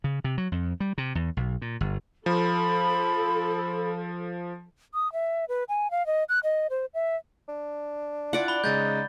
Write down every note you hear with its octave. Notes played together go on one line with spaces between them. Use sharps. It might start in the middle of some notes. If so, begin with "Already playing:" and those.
C#3
C3
F#3
F2
G3
C3
E2
B1
A#2
G1
F3 A4 B5
D#6
E5
B4
G#5
F5
D#5
F#6
D#5
C5
E5
D4
E4 F4 D5 F#5
B5 G7
C#3 G#3 D#4 G6 A6